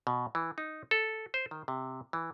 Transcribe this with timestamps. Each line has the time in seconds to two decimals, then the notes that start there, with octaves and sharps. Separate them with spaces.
0.07 B2
0.35 E3
0.58 D#4
0.91 A4
1.34 C5
1.51 D#3
1.68 C3
2.13 E3